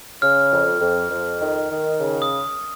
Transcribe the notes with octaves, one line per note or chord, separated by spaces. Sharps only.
C#3 F6
F2
F2
F2
D#3
D#3
C#3
D#6